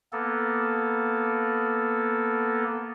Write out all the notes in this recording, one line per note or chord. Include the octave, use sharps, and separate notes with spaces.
A#3 B3 A4